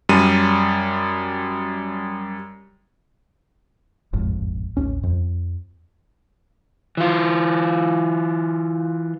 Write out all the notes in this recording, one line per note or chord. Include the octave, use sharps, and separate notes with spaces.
F#2 G3 D#7
E1 A1 F2 G#2
A1 D#2 C#4
F2
E3 F4